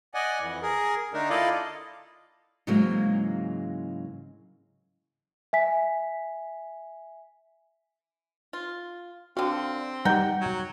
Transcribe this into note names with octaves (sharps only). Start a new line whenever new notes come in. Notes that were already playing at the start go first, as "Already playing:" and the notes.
D5 D#5 F#5 G#5
F2 E3
G#4 A#4
D3 A3 D4 D#4 A#4
E4 F4 A4 D5 D#5 F5
G#2 C#3 E3 F#3 G#3 A#3
E5 G#5 B6
F4
D3 C4 F#4 F5 G5
G3 D#4 G4 A#4 F#5 G5
F#3